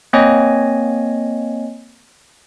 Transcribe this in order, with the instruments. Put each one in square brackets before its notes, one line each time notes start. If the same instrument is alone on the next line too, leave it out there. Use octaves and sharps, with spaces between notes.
[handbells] A#3 C4 C#5 D#5 G#5